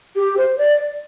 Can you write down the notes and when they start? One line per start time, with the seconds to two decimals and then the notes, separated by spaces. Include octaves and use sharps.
0.16 G4
0.37 C5
0.58 D5